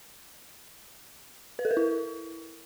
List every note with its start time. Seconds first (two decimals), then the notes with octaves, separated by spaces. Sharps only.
1.59 B4
1.65 A4
1.71 A#4
1.77 E4